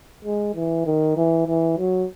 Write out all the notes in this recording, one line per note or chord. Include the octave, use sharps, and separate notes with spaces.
G#3
E3
D#3
E3
E3
F#3